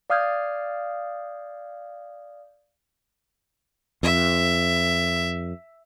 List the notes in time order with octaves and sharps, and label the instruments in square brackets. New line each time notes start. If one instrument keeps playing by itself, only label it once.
[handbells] D5 F5 D#6 F6 G6 G#6
[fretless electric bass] F2 [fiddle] E5